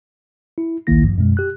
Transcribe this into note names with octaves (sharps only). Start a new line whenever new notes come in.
E4
A1 D2 D#3 A#3 E4 A#6
G2 F3
F#2 B2 G#3
G4 F#6